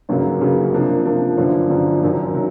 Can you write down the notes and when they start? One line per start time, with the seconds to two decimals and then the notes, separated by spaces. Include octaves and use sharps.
0.09 G1 F#2 C#3 F#3 A#3
0.41 G1 F#2 C#3 F#3 A#3
0.74 C3 F3 A#3 D4
1.05 C3 F3 A#3 D4
1.37 G1 F#2 D3 F3
1.70 G1 F#2 D3 F3
2.02 F#1 F#2 D#3 F#3
2.34 D#3 F#3